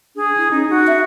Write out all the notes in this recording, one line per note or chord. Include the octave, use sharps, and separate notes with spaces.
D4 G#4
E4
C#4 D#4
D#4 F#4
E5